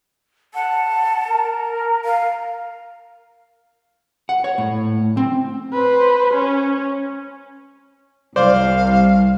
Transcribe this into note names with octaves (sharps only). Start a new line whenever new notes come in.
F#5 A5
A#4
F5
F#5
C#5
A2
C4
B4 C5
C#4
C2 C5 D5 F5